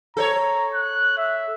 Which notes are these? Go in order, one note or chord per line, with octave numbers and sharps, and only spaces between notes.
A4 C5 C#5 A#5
F#6
E5